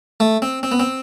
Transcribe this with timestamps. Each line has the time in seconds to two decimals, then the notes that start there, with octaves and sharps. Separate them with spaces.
0.20 A3
0.42 C4
0.63 C4
0.72 B3
0.80 C4